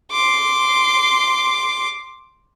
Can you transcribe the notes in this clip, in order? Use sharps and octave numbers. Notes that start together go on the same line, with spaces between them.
C6 D6